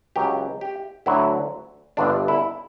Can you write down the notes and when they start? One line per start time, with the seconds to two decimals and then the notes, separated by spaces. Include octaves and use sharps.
0.16 C#2 C#3 F#3 G4
0.61 G4
1.06 D2 D3 F#3 E4
1.97 G1 G2 D3 D4
2.28 E4